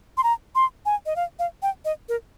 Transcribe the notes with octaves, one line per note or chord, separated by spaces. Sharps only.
C6
A#5
C6
G#5
D#5
F5
F5
G5
D#5
A#4